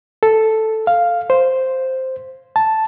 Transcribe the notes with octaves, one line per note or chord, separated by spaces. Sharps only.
A4
F5
C5
A5